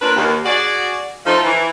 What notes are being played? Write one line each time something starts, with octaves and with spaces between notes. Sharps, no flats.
A#3 C#4 D4 F4 A#4 B4
D#2
F#4 G#4 D5
F3 A3 D#4
E3